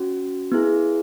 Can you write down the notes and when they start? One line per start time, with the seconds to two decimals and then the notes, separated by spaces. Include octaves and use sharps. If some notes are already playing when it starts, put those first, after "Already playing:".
Already playing: C#4 F#4
0.52 B3 E4 G#4